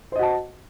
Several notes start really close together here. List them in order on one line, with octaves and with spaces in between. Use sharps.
C5 D#5 F#4 A5